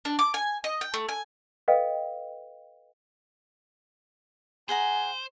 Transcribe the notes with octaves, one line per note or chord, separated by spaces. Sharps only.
D4
D6
G#5
D#5
G5
A3
G#5
A4 B4 D#5 F5 G5
G#4 C5 F#5 G#5 A#5